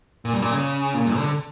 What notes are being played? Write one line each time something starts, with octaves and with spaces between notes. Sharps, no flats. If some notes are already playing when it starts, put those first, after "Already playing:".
A#2
G2
A#2
C#3
A#2
G2
D3